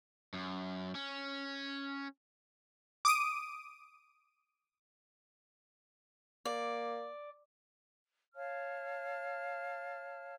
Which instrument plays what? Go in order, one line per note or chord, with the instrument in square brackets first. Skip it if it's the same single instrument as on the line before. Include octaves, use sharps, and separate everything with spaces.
[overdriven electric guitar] F#2
C#4
[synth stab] D6 D#6 D7 D#7
[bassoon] A#3 [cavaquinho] D5
[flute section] C#5 F5 A5 F6